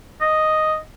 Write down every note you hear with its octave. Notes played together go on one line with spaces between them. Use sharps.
D#5